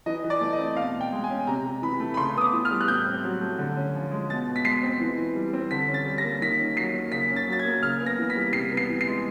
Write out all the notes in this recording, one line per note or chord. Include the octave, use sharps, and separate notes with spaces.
E3 D#5
E3
D5
A3
D#5
C4
B2 F5
B2
G5
G#3
G#5
C#4
C3 A#5
C3
E3 B5
A3
B5
C#3 C6
B3 D#6
D6
E3
F6
G3
F#6
A2 G6
C4
F#3
A3
D3
C#4
F3
G#3
B2 A6
B2
B6
G#3 C7
C4
E3
E3
G3
C4
D3 B6
C#4
A6
G3
A#6
A#3
D#3 B6
C#4
F#3 C7
A#3
C#3 B6
C#4
A6
F#3 A6
G#6
A#3
C#3 F6
B3
A#6
E3
B6
G3
C3 C7
B3
C7
E3
C7
G#3